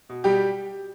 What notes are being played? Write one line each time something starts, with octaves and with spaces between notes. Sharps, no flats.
B2
B2 G3 G4